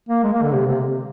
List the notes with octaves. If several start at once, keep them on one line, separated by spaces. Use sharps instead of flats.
A#3
G#3
A#3
D3
C3
C3